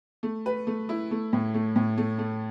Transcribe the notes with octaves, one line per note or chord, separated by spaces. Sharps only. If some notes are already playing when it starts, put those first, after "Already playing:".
A3
B4
A3
E4
A3
A2
A3
A2
A3
A3